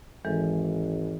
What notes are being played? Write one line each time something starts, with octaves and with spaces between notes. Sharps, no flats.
G#1 E3 G#3 A4